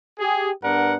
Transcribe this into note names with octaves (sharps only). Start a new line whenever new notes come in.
G4 G#4
G2 B3 D4 A#4 F#5